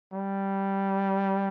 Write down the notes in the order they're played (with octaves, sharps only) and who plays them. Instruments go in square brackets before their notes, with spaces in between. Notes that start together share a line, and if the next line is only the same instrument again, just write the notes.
[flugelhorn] G3